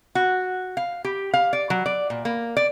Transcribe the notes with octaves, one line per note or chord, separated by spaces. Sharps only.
F#4
F5
G4
F5
D5
F#3
D5
A#2
A#3
D5